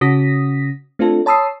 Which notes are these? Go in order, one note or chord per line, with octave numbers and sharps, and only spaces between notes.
C#3 C#4 F#4 D#6 A#6 B6
A3 C4 D4 F4 A4
C#5 A5 B5 D#6 E6 C7